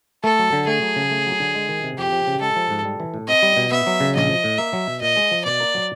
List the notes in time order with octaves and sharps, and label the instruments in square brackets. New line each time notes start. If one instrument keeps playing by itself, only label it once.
[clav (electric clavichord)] A3 [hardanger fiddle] A4
[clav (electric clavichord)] F#3
D3
[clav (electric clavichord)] A3 [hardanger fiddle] G#4
[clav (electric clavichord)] F#3
C#3
A3
F#3
D3
G#3
D#3
C3
[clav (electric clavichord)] F2 [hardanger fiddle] G4
[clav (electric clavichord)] F3
C#3
[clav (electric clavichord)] G#3 [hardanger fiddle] A4
[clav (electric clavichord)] F3
G#2
G3
E3
A2
[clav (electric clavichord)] C4 [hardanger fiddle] D#5
[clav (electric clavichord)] G3
B2
[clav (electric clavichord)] B3 [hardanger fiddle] E5
[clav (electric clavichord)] F#3
C#3
[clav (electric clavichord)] A#1 [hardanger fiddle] D#5
[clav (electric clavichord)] F3
A2
[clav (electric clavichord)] A#3 [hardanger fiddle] E5
[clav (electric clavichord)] F#3
B2
[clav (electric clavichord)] A#2 [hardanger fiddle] D#5
[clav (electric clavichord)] G#3
F3
[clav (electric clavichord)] B2 [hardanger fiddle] D5
[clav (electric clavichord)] A#3
F#3